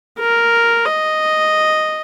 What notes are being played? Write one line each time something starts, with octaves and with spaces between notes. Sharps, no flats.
A#4
D#5